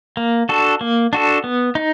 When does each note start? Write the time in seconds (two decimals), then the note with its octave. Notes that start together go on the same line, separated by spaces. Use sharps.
0.17 A#3
0.49 D4 F#4 A4
0.81 A#3
1.13 D4 F#4 A4
1.44 B3
1.75 D#4